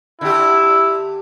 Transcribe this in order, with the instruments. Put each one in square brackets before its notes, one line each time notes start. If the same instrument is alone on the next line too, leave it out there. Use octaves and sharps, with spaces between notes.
[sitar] D3 G4 [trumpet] E4